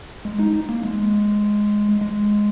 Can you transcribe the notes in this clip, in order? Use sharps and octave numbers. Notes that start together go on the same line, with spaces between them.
G#3
D#4
A#3
G#3
G#3